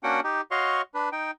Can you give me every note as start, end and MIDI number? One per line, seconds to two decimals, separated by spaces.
0.04 0.20 58
0.04 0.20 61
0.04 0.20 62
0.04 0.20 66
0.04 0.20 78
0.04 0.20 79
0.24 0.41 63
0.24 0.41 67
0.51 0.82 66
0.51 0.82 73
0.51 0.82 75
0.51 0.82 77
0.51 0.82 84
0.51 0.82 85
0.94 1.09 62
0.94 1.09 71
1.12 1.31 63
1.12 1.31 79